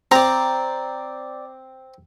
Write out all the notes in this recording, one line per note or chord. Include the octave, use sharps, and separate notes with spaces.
C4 D5 A#5